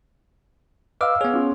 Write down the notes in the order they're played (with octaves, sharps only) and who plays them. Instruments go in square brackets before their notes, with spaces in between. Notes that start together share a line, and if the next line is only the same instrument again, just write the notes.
[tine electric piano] B4 D#5 D6 [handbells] F5 E6 F6
[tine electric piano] B3 G#4 [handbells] C#5
[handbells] C#4 F4